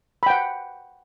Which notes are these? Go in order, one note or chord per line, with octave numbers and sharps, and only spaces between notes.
F#5 G5 B5